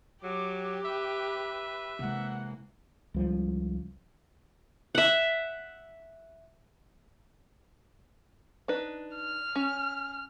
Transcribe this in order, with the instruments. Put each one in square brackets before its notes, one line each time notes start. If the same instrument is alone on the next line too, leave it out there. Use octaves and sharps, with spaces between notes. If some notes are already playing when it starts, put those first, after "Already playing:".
[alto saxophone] F#3 [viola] G4 [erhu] D6
[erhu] B4 [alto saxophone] E5
[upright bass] C3 G#3 [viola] E3 A#3 [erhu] F#5
[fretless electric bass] C#2 F3 G3
[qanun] E5 F#5
[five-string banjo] D4 D#4 B4
[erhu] F6
[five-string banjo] C#4